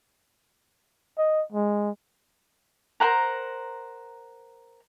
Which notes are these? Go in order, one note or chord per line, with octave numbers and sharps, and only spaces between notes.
D#5
G#3
A#4 C5 F#5 A#5